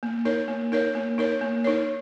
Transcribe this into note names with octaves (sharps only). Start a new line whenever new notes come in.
A#3
D#4 A#4 C#5
A#3
D#4 A#4 C#5
A#3
D#4 A#4 C#5
A#3
D#4 A#4 C#5